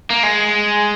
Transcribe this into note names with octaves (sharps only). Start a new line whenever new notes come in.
A#3
G#3